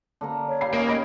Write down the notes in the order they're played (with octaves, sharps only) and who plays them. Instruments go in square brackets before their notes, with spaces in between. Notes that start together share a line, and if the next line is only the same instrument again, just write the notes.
[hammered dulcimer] D3 A#3 A#5
[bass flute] C#5
[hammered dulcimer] G4 [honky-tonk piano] F5 B5 C7
[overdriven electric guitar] A#3 [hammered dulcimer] C#4 D#4
[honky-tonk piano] D#5 B5 G#6